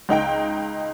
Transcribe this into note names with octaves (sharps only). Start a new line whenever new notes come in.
C#2 D#4 G5 D7